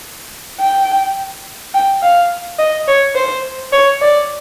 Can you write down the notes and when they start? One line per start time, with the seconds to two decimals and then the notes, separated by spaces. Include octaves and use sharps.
0.61 G5
1.74 G5
2.03 F5
2.59 D#5
2.88 C#5
3.15 C5
3.73 C#5
4.02 D5